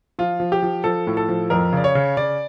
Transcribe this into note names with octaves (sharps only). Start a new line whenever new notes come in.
F3 F4
F3
G4
F3
F3 A4
A2
A4
F3
F2 A#4
C#3 D5
C#5
C#3
C#3 D5